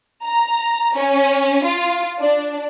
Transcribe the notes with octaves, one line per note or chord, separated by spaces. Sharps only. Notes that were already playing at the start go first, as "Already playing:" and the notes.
A#5
C#4
F4
D4